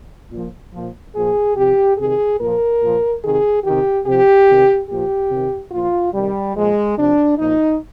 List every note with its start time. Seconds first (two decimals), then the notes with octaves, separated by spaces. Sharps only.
0.31 A#2 F3
0.74 A#2 F3
1.15 A#2 F3 G#4
1.56 C3 F3 G4
1.98 C3 D#3 G#4
2.39 A#2 F3 A#4
2.81 A#2 F3
3.22 C3 D#3 G#4
3.64 D#3 G4
3.69 C3
4.05 C3 F3 G4
4.47 C3 D#3
4.88 A#2 F3 G4
5.30 C3 D#3
5.72 A#2 F3 F4
6.13 C3 D#3 G3
6.55 A#2 F3 G#3
6.96 C3 F3 D4
7.38 A#2 F3 D#4